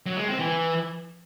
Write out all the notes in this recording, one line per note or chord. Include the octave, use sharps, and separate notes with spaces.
F#3
G#3
C4
E3